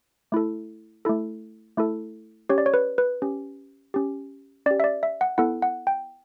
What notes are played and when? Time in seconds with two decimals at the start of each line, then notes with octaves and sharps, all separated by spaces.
0.32 A3 E4 A4
1.05 A3 E4 A4
1.77 A3 E4 A4
2.49 C#4 G4 C#5
2.58 D5
2.66 C#5
2.74 B4
2.98 B4
3.22 C#4 G4
3.94 C#4 G4
4.66 C#4 G4 D5
4.80 E5
4.84 D5
5.03 E5
5.21 F#5
5.38 B3 E4 A4 F#5
5.62 F#5
5.87 G5